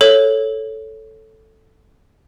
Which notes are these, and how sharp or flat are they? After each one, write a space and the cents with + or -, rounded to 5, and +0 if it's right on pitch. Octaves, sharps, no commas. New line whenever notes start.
A4 +0 C#5 +0